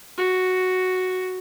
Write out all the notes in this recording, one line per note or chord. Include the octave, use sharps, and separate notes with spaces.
F#4